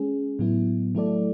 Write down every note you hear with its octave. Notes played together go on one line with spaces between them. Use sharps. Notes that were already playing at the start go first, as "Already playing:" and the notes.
Already playing: G#3 C#4 G#4
A2 F#3 B3 E4
F#3 A3 E4 A4 D5